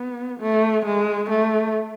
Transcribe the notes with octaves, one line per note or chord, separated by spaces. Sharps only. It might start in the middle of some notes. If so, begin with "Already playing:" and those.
Already playing: B3
A3
G#3
A3